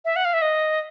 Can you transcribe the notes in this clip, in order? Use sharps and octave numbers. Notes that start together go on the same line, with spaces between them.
E5
F#5
F5
E5
D#5